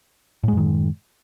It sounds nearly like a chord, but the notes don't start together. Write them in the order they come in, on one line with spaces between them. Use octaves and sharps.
A2 G#3 F#2 D#3